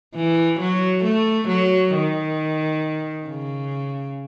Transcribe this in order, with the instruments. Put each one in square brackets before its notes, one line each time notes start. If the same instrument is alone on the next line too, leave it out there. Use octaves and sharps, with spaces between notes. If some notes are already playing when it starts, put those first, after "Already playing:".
[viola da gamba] E3
F#3
A3
F#3
D#3
C#3